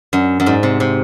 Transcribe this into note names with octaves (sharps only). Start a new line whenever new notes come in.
F#2
F#2
G#2
C3
C3